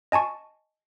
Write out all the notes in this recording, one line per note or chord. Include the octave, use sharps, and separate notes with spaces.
D#5 G#5 A5 C#6